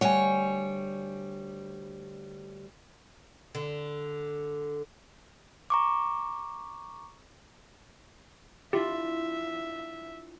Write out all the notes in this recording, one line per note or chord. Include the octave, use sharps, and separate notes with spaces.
D2 G3 C#5 F#5 G#5
D3
A#5 C#6 D6
D4 E4 F4 G4 E5